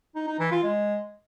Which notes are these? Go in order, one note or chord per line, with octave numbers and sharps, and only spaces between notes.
D#4
D#4
E3
F4
G#3